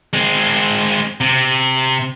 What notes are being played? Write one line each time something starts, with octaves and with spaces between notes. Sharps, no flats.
G#3 C4
C3